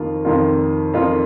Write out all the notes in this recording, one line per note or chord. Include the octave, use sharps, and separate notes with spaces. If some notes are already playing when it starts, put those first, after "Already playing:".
Already playing: F2 D#3 A#3 F4
F2 D#3 A#3 F4
F2 D#3 A#3 F4